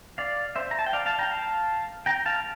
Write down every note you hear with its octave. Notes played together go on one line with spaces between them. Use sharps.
D5 F5
C5 E5
A#5
A5
G5
D5 F5
F5 A5
G5 A#5
F5 A5
G5 A#5
F5 A5